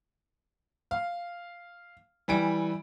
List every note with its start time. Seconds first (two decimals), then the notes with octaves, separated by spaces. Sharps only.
0.91 F5
2.28 E3 G3 G#5 D7